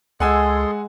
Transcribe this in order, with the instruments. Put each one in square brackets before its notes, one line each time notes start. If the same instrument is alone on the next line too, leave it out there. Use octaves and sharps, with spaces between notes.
[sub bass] C#2 [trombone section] G#3 [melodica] G#4 A4 C6 [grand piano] F#5 G#5 E6